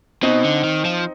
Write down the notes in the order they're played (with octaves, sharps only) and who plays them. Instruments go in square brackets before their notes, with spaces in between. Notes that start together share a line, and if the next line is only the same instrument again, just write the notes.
[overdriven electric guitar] B2 [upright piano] C4 D#4
[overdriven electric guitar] D3
D#3
F3